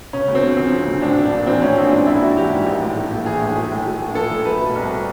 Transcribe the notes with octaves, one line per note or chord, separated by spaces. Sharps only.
C#3 C#4
D2
C4
D2
F3 C4
C#3
D2
A2 D4
A#1
D4
A#1
E3 C4
A2 C#4
A#1 D4
G#2 D4
A#1 E4
A#1 F#4
E3 G4
G#2
A#1
A2
A3
A#1
E3 G#4
A2
A3
A2
A3
A#1
F3 A4
A2
A3 B4
B2
C2